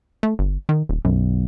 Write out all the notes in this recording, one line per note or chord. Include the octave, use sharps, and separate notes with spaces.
A3
G1
D#3
D#1
B1 F#2